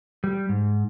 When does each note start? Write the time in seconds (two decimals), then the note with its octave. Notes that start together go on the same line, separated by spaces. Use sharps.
0.24 G3
0.49 G#2